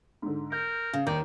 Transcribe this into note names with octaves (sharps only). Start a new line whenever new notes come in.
G#2 D3
A#4 G6
C#3
D#2 D#3 D5 G6